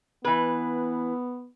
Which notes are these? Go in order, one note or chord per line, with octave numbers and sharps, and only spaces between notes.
E3 B3 B4